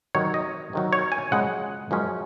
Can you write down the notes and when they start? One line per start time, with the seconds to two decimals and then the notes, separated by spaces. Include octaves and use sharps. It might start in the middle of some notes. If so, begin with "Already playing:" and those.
0.15 C3 D#3 F#3 C#5
0.34 D#5
0.73 C3 D#3 F#3
0.93 C#5
1.12 G#5
1.31 F#2 C#3 F3 G#3 C#4 F#5
1.91 F#2 C#3 F3 G#3 C#4